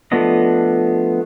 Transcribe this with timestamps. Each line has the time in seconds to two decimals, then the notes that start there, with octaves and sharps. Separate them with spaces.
0.12 F3 A3 B3 D4 D#5